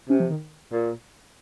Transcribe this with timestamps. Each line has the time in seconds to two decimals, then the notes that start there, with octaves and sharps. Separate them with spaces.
0.09 C3 C#4
0.20 F3
0.30 D#3
0.72 A#2